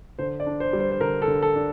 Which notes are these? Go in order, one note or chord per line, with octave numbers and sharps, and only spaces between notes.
D3 C5
D5
D4
C5
G3
C5
C5
D3 A#4
A4
D3
A4
D4